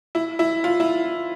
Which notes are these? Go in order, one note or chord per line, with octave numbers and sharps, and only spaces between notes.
E4
E4
F4
E4